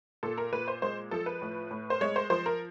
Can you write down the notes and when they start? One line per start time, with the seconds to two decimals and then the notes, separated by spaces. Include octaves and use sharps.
0.23 A#2 A4
0.38 A#4
0.52 A#2 B4
0.68 C5
0.82 G#3 C5
1.11 F3 A4
1.26 B4
1.42 A2
1.71 A2
1.90 C5
2.01 G#3 C#5
2.16 C5
2.30 F3 C5
2.46 A#4